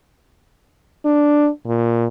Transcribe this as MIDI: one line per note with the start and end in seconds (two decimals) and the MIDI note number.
1.05 1.49 62
1.67 2.07 46